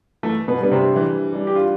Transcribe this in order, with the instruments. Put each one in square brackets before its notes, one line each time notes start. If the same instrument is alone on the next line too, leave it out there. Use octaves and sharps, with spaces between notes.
[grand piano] E3 [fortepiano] A3
[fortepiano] B2 B3
[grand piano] G3 D4 [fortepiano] B3
[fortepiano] C3 C4
[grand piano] E3
G3 D4
[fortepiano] G4
F4